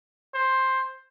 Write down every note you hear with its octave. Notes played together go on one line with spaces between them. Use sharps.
C5